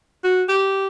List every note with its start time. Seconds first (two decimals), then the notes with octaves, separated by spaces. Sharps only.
0.24 F#4
0.48 G4